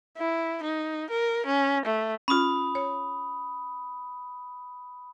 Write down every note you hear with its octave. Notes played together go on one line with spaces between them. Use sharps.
E4
D#4
A#4
C#4
A3
C#4 F4 B5 D#6
C#5